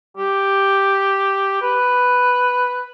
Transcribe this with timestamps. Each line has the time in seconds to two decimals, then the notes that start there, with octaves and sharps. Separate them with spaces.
0.17 G4
1.62 B4